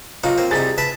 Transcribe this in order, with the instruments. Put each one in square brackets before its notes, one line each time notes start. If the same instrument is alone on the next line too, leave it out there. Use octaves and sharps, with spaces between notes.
[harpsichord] B1 D#4 F#4 [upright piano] F4
[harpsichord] A#3 C4
[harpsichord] C2 C3 D#4 [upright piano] G#4 A6
[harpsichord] B4 E5 A5